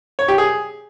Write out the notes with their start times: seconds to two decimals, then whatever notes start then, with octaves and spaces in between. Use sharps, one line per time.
0.19 C#5
0.28 G4
0.38 G#4